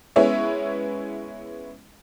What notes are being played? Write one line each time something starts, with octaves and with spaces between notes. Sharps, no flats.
G#3 B3 C#4 E4 C#5 E5